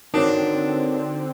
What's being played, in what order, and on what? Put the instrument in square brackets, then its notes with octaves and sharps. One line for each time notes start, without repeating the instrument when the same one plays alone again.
[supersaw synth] D3 C4 [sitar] D4 [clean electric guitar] D#4 F#4 C5 [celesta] A#4 C#5